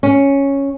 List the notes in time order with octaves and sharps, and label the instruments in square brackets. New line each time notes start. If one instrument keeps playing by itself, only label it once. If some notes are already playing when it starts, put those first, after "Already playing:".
[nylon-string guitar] C#4